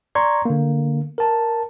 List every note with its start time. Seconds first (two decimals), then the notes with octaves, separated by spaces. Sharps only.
0.15 D5 A#5 C6 C#6 G#6
0.45 D3 A#3
1.18 A#4 A5